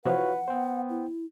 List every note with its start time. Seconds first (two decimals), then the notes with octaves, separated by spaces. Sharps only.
0.05 C3 E3 F3 F#4 B4 C#5 F5 F#5
0.48 B3 C5 G5
0.89 E4